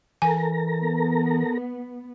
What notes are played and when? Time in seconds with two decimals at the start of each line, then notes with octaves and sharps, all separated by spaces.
0.22 E3 A4 A#4 G#5 A#5
0.81 B3